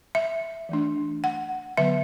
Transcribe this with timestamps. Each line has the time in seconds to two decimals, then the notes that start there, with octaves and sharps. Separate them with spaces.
0.15 E5
0.69 E3 A3 D4
1.24 F#5
1.77 D3 F#3 B3 E5